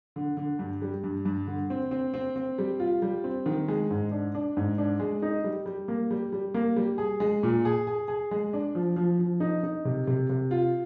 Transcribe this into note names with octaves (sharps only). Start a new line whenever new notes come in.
D3
D3
G2
G3
G2
G2
D3
C4
C4
C4
C4
G3
F4
G3
C4
D#3
G#3
G#2
D4
D4
G#2
D4
G#3
D#4
G3
G3
A#3
G3
G3
A#3
G3
G#4
G#3
A#2
G#4
G#4
G#4
G#3
D4
F3
F3
F3
D#4
D#4
C3
C3
C3
F4